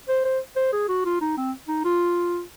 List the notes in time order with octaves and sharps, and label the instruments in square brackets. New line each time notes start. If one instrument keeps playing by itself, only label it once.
[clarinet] C5
C5
C5
G#4
F#4
F4
D#4
C4
D#4
F4